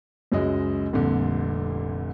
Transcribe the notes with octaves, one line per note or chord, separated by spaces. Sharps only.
C#2 F#2 F#3 G#3 D#5
F1 C2 A#2 D3